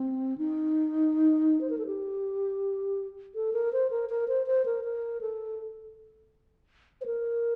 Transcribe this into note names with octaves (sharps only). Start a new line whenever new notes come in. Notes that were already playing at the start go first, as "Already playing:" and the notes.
Already playing: C4
D#4
C5
A#4
A4
G4
A4
A#4
C5
A#4
A#4
C5
C5
A#4
A#4
A4
C5
A#4